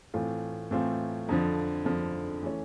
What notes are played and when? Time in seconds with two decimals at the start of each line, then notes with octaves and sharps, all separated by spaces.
0.14 A2 E3 A3 C4 F4
0.71 A2 E3 A3 C4 F4
1.29 F2 D3 F3
1.85 F2 D3 F3
2.43 E3 A3 C#4